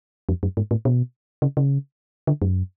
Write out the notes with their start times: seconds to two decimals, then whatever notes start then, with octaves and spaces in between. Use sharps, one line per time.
0.29 F2
0.43 F#2
0.57 G#2
0.71 A2
0.85 B2
1.42 C#3
1.57 C#3
2.27 D3
2.42 F#2